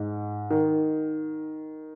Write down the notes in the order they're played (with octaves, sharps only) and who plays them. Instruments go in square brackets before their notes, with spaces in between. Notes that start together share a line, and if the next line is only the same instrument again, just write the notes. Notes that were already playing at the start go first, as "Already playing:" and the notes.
Already playing: [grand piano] G#2
D#3